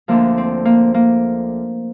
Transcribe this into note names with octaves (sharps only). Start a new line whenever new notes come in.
D2 D3 F3 A#3
C4
A#3
A#3